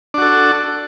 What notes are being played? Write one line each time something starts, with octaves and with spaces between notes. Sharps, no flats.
D4 F#4 A4